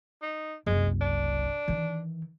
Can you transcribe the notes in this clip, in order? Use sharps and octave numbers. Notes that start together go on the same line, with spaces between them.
D#4
F#1 C2 G#3
D4
D#3 E3